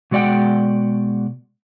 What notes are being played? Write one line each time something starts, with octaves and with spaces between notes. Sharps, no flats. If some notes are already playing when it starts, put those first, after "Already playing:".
B2 G#3 F#4 D5 F#5 G5